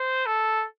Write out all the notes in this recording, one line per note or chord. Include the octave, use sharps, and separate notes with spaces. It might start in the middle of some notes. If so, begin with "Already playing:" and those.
Already playing: C5
A4